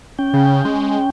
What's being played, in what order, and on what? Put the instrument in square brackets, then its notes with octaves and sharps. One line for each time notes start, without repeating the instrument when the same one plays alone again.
[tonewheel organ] C#4 G5
[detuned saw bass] C#3
G#3